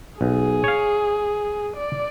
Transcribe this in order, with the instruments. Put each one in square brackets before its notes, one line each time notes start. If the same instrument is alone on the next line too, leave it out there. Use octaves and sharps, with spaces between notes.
[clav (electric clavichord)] B1 [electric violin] G#4
[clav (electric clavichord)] C#5 F5
[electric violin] D5